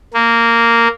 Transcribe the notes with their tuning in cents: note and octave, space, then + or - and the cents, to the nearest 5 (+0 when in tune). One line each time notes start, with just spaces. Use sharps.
A#3 -10